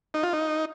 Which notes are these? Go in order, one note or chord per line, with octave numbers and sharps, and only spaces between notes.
D#4
F4
D#4